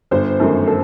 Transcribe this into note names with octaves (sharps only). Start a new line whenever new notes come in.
G1 C5
F#2 D#3 A3
A4